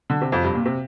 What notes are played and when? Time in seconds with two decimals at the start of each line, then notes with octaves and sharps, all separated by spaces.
0.10 D3
0.22 C3
0.32 F2
0.44 G2
0.55 A#2
0.66 C3